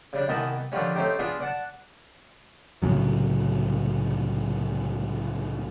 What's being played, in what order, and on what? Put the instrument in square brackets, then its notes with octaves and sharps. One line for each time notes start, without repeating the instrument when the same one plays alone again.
[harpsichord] C#3 G3 D4
C2 D#3 B3 D#5 G#5 A5
D3 D#3 F3 G3 C#4
A3 C4 C#4 D#4 G4
B3 D4 F4 G#4
D5 F#5 A5
[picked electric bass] C2 A2 C#3 F#3